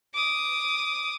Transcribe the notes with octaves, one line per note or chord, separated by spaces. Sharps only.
D6 D#6